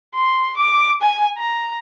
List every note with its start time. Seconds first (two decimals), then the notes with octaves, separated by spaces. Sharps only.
0.14 C6
0.57 D6
1.02 G#5
1.38 A#5